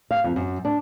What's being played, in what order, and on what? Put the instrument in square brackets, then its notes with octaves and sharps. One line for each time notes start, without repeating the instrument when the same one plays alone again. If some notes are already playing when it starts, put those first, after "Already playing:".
[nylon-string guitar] F5
F2
F#2
D4